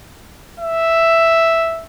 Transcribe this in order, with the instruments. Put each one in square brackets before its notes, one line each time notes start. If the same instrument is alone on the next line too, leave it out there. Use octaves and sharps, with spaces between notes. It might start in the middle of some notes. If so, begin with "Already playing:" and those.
[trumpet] E5